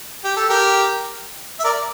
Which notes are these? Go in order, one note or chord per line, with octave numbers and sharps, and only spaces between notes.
G4
A4
G4 A#4
E5
A#4 D5